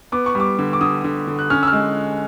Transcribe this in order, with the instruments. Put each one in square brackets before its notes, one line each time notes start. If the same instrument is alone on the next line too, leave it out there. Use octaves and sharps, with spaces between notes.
[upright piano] B3 D6
C#6
G3
D6
D3
D6
D3 D#6
D3
D3
F#6
C#4 F6
E6
F6
G#3